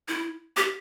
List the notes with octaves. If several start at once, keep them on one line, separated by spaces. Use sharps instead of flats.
E4
G4